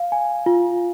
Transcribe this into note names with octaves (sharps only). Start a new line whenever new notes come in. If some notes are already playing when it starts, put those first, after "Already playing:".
Already playing: F5
G#5
F4